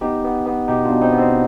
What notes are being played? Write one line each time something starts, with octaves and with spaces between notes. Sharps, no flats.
B3 D#4 G4
B3
B3
B2 D#4 G4
B2 D4 F4
C4 D#4
B3
C4